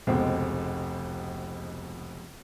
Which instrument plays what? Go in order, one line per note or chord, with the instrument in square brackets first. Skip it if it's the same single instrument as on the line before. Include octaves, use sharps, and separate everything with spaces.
[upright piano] F1 C#2 B2 G#3 C4